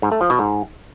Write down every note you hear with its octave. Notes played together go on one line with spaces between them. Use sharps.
G#2
A3
F3
B2
G#2